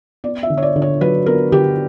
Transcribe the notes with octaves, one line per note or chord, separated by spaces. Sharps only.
B3 D5
E5
D3
C#5
D5
D3
C#5
F#3 B4
B3 A#4
D3 G4